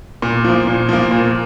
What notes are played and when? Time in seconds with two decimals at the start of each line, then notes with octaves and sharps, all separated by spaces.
0.22 A#2
0.44 F3 A#3
0.67 A#2
0.89 F3 A#3
1.11 A#2